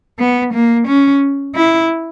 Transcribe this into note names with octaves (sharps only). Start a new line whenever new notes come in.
B3
A#3
C#4
E4